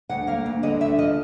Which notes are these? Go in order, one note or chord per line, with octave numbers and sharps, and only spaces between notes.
D2 F#5
A#3 F5
D2
D3 D#5
D2 E5
F3 D#5